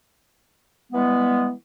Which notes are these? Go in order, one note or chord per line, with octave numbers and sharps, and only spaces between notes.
E3 G3 G#3 B3